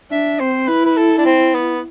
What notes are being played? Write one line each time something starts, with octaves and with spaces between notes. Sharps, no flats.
D4 E5
C4 C5
E4 B4
B4
A4
D4
C4
B3